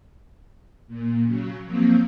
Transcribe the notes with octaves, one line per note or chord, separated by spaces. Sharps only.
A#2
C#3 F#3
F3 F#3 A#3 C4